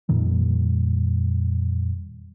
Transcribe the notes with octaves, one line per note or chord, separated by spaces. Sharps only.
F2 A#2 D#3 G3